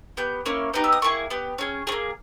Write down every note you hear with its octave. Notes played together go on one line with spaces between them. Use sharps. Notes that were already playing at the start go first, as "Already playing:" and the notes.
B3 G4 G6
A#3 C#4 E4
B3 D#4 G4 G6
E6
D#6
A#3 E4 G#4 C#6
B3 G4
C#4 G#4
A#3 C#4 G#4